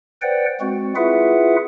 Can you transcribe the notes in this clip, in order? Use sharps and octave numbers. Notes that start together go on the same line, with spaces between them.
B4 C5 D5 F#5 G5
G#3 C4 F#4
E4 F4 G#4 B4 E5 F#5